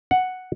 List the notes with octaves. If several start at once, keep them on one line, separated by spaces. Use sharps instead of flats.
F#5